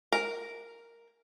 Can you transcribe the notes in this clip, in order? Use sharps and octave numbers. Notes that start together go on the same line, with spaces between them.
A#4